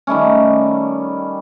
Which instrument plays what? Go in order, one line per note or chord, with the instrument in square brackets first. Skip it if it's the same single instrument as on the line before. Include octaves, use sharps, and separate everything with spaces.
[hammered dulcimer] D#3 G3 A3 C#4